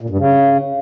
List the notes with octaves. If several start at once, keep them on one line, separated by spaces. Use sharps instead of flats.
A#2
G2
C#3